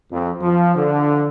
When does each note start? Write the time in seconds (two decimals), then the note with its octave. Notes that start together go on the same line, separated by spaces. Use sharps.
0.12 F2
0.42 F3
0.75 D3